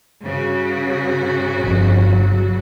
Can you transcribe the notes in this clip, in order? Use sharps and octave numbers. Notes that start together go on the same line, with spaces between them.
G2 C#3 F#4
G1 F2
F#3